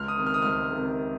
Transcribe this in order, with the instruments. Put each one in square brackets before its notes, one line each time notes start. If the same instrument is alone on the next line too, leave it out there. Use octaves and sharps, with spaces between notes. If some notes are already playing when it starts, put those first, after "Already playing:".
Already playing: [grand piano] C#2 F6
D#6
C3 D#3
F6
D#6
C#2 F6
C3 D#3